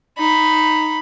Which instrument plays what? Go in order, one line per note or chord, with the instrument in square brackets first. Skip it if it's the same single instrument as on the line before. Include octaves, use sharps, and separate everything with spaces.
[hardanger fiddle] D#4 B5